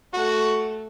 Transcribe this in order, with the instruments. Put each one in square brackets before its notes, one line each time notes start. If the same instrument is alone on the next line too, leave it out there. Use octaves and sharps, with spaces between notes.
[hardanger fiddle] A3 [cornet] F#4